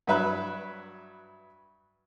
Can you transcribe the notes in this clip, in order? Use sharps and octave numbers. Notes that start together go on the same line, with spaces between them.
G2 F#3 B4 E5 B5 F#6